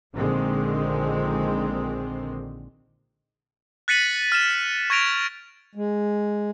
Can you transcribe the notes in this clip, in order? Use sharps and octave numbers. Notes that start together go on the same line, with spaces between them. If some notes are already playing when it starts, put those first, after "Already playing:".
A#1 D3 D#3 G#3 C4
F#6 A6 B6 C#7 D#7 F#7
F6 E7
C#6 G#6 A#6 D7 F7
G#3